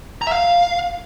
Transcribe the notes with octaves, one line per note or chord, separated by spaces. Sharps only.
A#5
E5
F5